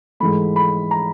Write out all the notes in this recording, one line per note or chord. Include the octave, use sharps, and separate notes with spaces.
G#2 E3 A3 B5
B5
A#5